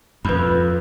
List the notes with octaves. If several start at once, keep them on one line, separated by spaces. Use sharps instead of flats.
F2 B4 B5